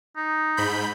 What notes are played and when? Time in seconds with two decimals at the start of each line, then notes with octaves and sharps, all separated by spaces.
0.17 D#4
0.57 G#2 B5 G6